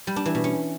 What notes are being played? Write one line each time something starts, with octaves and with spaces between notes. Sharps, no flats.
G3
D4
E3
B2
C#4